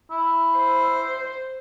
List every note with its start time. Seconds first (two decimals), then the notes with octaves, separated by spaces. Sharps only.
0.11 E4
0.57 C5